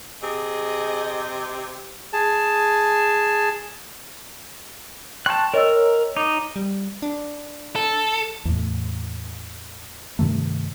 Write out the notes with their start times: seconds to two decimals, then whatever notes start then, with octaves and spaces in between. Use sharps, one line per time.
0.23 C3 G#4 D#5
2.13 G#4 A5
5.26 G5 A5 C6 C#6 F#6
5.54 A#4 C#5 D#5 E6
6.17 D#4 D6
6.56 G3
7.02 D4
7.76 A4
8.45 E2 A2
10.19 G2 C3 D#3 A3